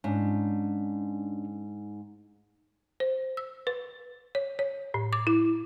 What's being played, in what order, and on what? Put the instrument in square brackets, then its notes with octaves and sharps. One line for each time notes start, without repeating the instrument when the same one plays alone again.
[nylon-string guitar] G#2 [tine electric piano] C#4 D4
[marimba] C5
E6
B4
C#5
C#5
A2
D6
E4